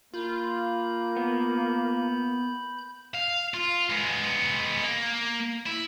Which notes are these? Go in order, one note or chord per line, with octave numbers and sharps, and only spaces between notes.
A#3 F4 B5 G6
B3
F5
F4
G#3 B3
A#3
E4